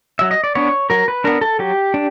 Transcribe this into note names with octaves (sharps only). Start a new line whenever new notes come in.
F#3 E5
D#5
D5
B3 D4 C#5
F#3 A#4
B4
B3 D4 A#4
A4
F#3 G4
D4